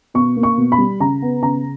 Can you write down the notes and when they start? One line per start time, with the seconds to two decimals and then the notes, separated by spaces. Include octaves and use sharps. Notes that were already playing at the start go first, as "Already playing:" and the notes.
0.14 B2 C#6
0.37 A#3
0.43 C#6
0.57 B2
0.72 B5
0.78 G3
1.00 C#3 A#5
1.22 B3
1.42 C#3 A#5